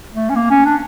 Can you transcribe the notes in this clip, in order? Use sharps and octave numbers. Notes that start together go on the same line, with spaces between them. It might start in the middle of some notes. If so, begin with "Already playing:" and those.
A3
C#4
A#3
C#4
D4